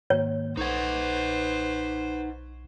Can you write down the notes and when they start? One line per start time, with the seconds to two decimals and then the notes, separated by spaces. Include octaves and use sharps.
0.10 G#2 D#3 A#3 C#5
0.57 B1 D#4 B4 C5 F#5 C#6 G#6